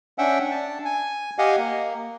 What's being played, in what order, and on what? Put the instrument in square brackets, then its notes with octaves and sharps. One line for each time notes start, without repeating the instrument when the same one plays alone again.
[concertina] C#4 D4 E5 F#5 G5
D4 A5
G#5
G4 D#5 F5 F#5 G#5
A#3